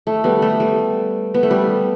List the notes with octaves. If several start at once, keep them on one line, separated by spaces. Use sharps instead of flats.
A3
G3 B3
A3
G3
B3
A3
G3